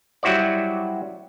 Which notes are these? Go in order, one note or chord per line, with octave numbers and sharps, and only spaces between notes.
F#3 G3 E4 F#4 C5 D5